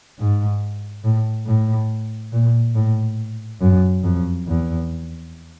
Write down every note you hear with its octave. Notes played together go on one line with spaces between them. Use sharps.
G#2
A2
A2
A#2
A2
F#2
F2
E2